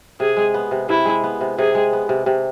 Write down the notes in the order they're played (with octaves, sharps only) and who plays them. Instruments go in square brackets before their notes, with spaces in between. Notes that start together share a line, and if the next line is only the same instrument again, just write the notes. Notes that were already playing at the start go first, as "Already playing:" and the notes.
[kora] C3 [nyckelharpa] G#4
[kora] G#3
B3
C3
[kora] C3 [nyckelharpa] E4
[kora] G#3
B3
C3
[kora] C3 [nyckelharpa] G#4
[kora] G#3
B3
C3
C3